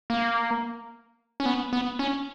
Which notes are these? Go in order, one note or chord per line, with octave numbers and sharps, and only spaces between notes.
A#3
C#4
B3
B3
C#4